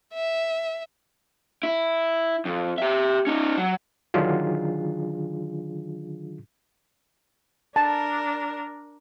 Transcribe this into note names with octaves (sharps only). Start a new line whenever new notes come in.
E5
E4
F2
G4 E5
C#4 D#4
F#3
D3 D#3 F#3 D4 F4 G#4
D4 A#4 A5